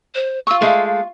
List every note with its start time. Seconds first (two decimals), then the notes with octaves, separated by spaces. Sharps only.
0.15 C5
0.47 F4 C#6 E6
0.62 G#3 A3 F5